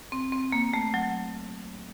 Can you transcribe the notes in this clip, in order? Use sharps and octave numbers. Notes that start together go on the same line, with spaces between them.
C4
C4
A#3
A3
F#3